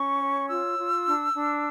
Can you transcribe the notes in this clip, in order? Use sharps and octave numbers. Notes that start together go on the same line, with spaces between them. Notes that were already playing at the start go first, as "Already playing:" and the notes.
Already playing: C#4 C#6
C#5
F4 E6
F4
D4
D4